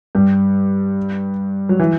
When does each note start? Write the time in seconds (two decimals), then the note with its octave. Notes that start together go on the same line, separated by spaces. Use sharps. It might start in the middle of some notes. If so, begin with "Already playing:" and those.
0.15 G2 G3
1.69 F#3
1.80 E3